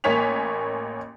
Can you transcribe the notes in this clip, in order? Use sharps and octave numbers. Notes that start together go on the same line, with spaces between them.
A1 A#3 C#5 G#5 B6 F7